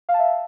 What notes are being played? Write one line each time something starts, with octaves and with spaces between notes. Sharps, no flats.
F5
A5
E5